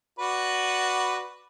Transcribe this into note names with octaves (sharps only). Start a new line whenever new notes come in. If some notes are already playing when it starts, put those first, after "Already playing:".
F#4 B4 D5